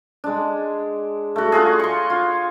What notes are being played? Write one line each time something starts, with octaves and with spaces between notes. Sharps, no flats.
G#3 D4
A3 F#4
F4 F#4 G#4
C6 C#6
F4